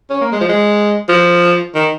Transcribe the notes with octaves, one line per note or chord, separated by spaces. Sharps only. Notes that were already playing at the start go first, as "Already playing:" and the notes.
C#4
A#3
G#3
F3
G#3
F3
D#3